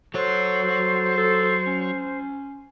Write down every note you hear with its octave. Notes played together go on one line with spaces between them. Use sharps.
F#3 A4 C5 C#5
A4
C#4